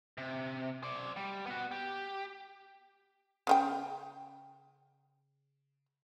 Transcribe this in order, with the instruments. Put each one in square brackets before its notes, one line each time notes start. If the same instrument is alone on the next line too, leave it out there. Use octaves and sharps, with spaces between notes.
[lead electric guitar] C3
C5 D5
G3
B3 F#4
G4
[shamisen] C#3 F4 G5